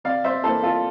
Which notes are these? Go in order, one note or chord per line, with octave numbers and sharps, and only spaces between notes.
C3 D5 F5
C5 E5
E3 A#3 A4 C5
F4 A4